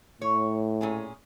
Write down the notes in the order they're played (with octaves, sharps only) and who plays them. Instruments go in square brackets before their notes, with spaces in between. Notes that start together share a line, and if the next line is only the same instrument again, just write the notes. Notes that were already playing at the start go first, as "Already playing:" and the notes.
[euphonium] A2 [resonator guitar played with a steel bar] C#5
[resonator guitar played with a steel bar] A#2 C#4 G#4